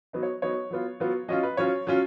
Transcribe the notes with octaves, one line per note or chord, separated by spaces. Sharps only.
F#3 B3 D#4
C#5
F#3 B3 D#4 C#5
F#3 B3 F4
F#3 B3 F4
F#3 C#4 F4 D#5
B4
F#3 C#4 F4 C#5
F#3 C#4 F4